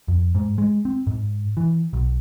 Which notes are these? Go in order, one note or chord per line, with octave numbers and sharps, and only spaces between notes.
F2
G#2
G#3
C4
G#2
E3
B1